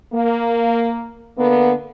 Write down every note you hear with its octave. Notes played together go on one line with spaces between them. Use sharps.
A#3
D3 A#3 B3